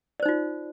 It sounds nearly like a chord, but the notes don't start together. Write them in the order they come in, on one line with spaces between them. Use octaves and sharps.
D5 C5 D#4 F4